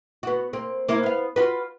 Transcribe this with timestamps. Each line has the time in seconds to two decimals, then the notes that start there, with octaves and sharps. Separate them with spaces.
0.23 B3 F#4
0.53 A#3 C4
0.89 A#3 E4 C5
1.03 B3 F5
1.36 F4 F#4 B4